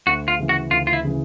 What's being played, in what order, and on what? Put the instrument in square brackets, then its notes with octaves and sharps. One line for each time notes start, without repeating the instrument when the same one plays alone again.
[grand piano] D2 [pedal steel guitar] F#4
[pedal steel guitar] F4
[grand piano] C#3 E3
[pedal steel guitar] F#4
[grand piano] D2 [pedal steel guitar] F4
[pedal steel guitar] F4
E4
[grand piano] C#3 E3